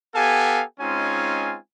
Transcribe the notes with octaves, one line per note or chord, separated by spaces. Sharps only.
B3 G4 A4 F5 G#5
G#3 C4 C#4 D#4 F4 G#5